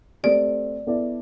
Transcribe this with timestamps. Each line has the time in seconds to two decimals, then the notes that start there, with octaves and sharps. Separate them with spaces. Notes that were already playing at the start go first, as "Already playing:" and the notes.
0.23 A3 C4 G4 D5
0.87 B3 E4 A4 D5